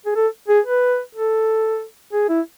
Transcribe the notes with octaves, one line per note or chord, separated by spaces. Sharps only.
G#4
A4
G#4
B4
A4
G#4
E4